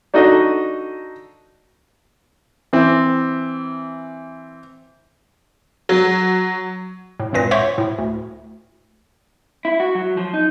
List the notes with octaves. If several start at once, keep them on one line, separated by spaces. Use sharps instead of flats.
D4 D#4 F#4 A4 D#5
E3 C4
F#3
A2
G#1 C#2 G2 A#2 B4 A#6
C5 C#5 E5 F#5 C6 C#6
A2
D2
E4
F#4
F#3
F3
D#4